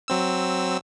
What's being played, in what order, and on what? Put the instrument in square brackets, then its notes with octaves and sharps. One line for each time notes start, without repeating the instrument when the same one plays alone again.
[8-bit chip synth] F#3 C4 E6